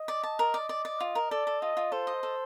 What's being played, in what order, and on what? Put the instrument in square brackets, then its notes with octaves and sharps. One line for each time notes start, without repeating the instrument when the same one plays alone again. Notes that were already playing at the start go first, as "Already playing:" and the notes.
Already playing: [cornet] D#5
[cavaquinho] D5
A5
A#4
D5
D5
D5
F4
A#4
[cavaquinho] A4 [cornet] D5
[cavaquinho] A4
[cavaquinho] F4 [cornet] D#5
[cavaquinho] F4
[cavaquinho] A4 [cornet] C5
[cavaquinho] D#5
A4